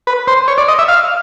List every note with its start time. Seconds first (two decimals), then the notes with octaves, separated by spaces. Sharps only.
0.07 B4
0.27 C5
0.48 C#5
0.58 D5
0.68 D#5
0.79 E5
0.88 F5